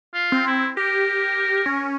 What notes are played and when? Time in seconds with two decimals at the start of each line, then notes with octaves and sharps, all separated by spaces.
0.14 F4
0.32 C4
0.47 E4
0.77 G4 A#4
1.66 C#4